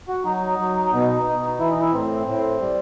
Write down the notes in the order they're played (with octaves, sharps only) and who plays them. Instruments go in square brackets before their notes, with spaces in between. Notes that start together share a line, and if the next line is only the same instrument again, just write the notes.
[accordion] F#4
F#3 D#4
F#3
B2
B2
E3 E4
D#4
E4
A2 C4
A2
G3